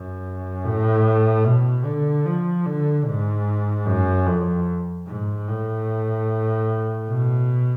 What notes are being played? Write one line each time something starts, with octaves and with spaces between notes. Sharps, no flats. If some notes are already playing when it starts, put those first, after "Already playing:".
Already playing: F#2
A2
B2
D3
F3
D3
G#2
F#2
F2
G#2
A2
B2